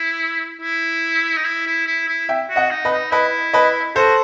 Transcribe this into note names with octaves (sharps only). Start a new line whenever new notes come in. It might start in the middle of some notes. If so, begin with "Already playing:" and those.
Already playing: E4
E4
D#4
E4
E4
E4
E4
E5 G5
F#4
D#5 F#5
D#4
B4 D#5
D#4
E4 B4 D#5
B4 D#5
F#4 A4 C5